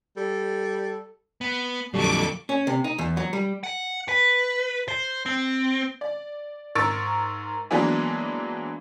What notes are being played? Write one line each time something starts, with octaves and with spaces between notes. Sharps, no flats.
G3 A4
B3
F2 A#2 D3 F#3 G3 A4 C#6 D6
C#4
C3
D#4
E2
F#3
G3
F#5
B4
C5
C4
D5
G#2 A#4 C#6 E6 A6 D7
E3 F#3 G#3 A#3 B3 D4